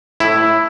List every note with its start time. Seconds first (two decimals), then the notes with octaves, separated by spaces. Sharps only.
0.20 A2 E4